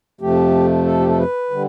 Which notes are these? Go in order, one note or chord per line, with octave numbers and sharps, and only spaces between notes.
F2 C3 F3 A3 G4
A4
G4
A4
B4
D3 G3